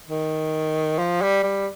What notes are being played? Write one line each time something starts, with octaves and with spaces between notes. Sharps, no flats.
D#3
F3
G3
G3